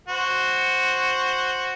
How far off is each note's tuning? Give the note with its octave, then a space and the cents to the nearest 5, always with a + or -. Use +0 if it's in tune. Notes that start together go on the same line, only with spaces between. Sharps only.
F#4 +0 C5 +5